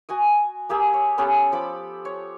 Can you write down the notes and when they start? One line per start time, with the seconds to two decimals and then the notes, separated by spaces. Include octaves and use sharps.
0.09 F#4 G#5 D#6
0.69 A#3 G4 G#4 E6
0.94 C#5
1.18 B3 C#4 G4 A4
1.52 F3 B5 D6
2.05 C#5